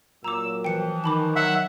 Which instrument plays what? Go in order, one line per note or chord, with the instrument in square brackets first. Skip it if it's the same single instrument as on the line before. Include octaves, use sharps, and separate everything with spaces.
[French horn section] A#2 F#3 [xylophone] A#5 D6 [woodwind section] E6
[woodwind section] E3 F3 [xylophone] G5 C#7
[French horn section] D#3 [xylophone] A5 B5 D6
[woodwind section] F#3 [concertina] E5 F#5